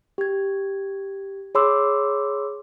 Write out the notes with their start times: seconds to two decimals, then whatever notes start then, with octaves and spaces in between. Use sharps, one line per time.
0.18 G4 G#6
1.55 G#4 C#5 B5 C6 D6 E6